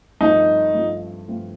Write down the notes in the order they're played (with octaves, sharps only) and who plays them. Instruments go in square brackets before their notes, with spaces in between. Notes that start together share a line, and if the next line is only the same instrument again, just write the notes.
[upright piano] G2 F3 A3 C4 F4 [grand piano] D#4
[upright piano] G2 F3 A3 C4 F4
G2 F3 A3 C4 F4